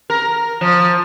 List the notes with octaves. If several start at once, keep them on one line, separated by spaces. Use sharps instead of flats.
A#4
F3